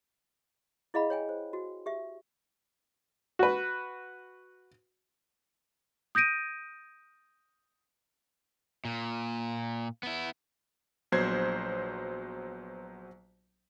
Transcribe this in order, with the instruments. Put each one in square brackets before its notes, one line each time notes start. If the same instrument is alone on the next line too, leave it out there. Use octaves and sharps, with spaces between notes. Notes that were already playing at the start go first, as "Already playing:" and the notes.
[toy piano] E4 G#4 D#5 F5 F#5 B5
C#5 G5 G#5
C5
F#4
G4 E5
[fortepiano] F#4 B4
[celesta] D#6 G6 A#6 D7 D#7
[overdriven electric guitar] A#2
B3 E4
[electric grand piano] A#1 F#3 B3 C5 G#6 C7